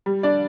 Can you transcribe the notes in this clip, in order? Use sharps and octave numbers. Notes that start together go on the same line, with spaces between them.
G3
D4 D5